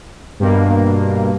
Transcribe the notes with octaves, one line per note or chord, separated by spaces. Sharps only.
G2 B2 A#3